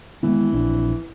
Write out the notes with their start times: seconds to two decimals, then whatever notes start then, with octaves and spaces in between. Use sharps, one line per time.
0.23 D#3 E3 G#3 B3
0.53 A#1 C4 D4